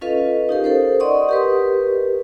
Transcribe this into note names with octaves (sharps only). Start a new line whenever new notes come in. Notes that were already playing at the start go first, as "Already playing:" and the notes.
C#4 F4 A4 B4 D#5 F5
D#4 G4 A#4
A4 A#4 C5
D5 D#5 F#5 C6 C#6 D#6
G4 A#4 B4